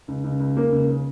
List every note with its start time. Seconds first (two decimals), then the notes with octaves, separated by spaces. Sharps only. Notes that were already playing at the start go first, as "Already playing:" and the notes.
0.08 C#2
0.24 C#2
0.40 C#2
0.57 C#3 A#3
0.72 C#2
0.89 C#3